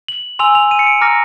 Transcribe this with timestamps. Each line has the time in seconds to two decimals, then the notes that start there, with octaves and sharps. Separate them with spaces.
0.08 F#7
0.39 G#5 C6 E6 F7
0.55 F7
0.71 D#7
0.79 C#7
0.87 D7
1.01 A#5 D6 F6 A#6